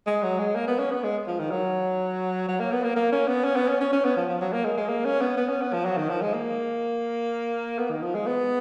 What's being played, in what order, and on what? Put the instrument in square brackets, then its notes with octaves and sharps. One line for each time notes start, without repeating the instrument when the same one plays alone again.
[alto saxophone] G#3
F#3
G#3
A#3
B3
C#4
B3
G#3
F3
D#3
F#3
F#3
A#3
B3
A#3
A#3
C#4
B3
C#4
B3
C#4
C#4
C#4
B3
F3
F3
F#3
A#3
G#3
G#3
A#3
C#4
B3
B3
C#4
B3
F3
F#3
D#3
F3
G#3
A#3
B3
D#3
F3
G#3
B3